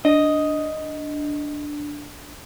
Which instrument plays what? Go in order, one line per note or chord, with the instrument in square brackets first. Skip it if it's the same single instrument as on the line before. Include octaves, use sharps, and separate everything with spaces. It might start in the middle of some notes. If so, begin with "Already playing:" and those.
[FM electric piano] D4 [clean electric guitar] D#5